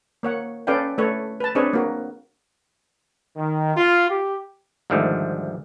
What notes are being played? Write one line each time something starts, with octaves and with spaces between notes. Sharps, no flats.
A#3 C#5 F#5
C#4 A4 B4 D5 F5 G5
A3 A4 B4 C#5
B4 A5
C4 D4 G#4 B4 C#5 D#5
A#3 F#4
D#3
F4
G4
D2 G#2 D#3 F3 G3 A3